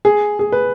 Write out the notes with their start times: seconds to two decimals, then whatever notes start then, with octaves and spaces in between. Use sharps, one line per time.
0.05 G#4
0.39 G#4
0.52 B4